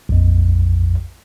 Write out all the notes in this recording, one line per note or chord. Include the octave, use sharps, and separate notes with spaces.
A#1 F2